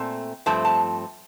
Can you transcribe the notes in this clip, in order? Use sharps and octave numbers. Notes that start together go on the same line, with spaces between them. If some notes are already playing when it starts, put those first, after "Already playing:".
Already playing: A#2 A3 C4
G2 F3 A3 C4 A5
A5